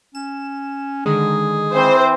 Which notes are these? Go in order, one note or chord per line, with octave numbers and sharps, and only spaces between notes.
C#4 E7
D3 D#3 G#3 G#4
E3 C4 C5